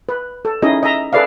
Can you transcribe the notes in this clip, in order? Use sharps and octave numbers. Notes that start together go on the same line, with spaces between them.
B4
A4
C#4 D#4 E4 G#4 D#5
D#5 E5 A#5
G#4 A4 B4 D5 E5 F5